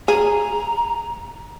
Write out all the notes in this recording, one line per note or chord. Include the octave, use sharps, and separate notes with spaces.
G#4 A#5